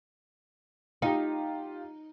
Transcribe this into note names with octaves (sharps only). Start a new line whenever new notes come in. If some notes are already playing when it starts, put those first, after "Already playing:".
D#4 F4 G4